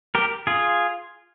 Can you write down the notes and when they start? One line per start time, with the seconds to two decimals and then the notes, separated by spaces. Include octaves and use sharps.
0.15 G4 A#4
0.47 F4 G#4